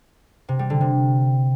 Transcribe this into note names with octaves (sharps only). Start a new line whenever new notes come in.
C3
G3
D3
C3